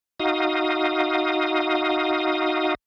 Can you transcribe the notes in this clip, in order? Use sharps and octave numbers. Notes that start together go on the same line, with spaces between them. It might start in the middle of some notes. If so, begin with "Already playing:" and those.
D#4 F#4 F5 D#6